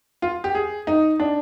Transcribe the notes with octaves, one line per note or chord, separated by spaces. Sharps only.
F4
G4
G#4
D#4
D4